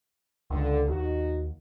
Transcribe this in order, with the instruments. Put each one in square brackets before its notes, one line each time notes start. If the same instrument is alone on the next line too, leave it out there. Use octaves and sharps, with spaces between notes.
[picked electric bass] C#2 [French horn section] D3
[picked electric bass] D#2 [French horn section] D#4 F#4